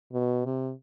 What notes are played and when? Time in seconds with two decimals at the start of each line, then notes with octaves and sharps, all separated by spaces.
0.13 B2
0.45 C3